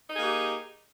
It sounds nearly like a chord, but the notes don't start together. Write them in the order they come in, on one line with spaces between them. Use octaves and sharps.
D#4 G#4 A#3 G4